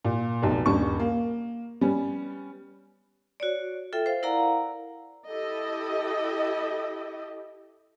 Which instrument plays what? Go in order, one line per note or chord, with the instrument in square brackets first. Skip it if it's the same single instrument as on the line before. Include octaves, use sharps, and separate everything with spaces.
[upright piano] A#2
F1 B1
D#1 G2 C#4 C#6
A#3
G3 B3 C#4
[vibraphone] F#4 C#5 D5
F4 A4 E5 G5
C5 F5
E4 A#4 D5 F5 F#5 A#5
[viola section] E4 G4 A4 D#5